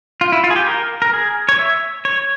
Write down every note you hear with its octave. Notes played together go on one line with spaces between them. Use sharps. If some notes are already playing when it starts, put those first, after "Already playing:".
F4
E4
F4
G#4
G4
A#4
A#4
G#4
C#5
E5
C#5